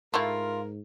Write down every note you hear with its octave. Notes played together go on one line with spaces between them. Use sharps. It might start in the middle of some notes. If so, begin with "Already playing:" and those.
G#2 A3 E4 F4 A#4